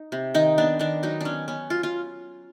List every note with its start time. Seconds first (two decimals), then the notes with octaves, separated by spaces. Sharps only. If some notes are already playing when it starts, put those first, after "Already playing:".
Already playing: D#4
0.12 C3
0.34 D#3 D#4
0.58 B3 D4
0.79 D#3 D4
1.03 F#3 D#4
1.21 B3 C#4 D4
1.48 B3 C#4
1.70 F#3 F4
1.83 F4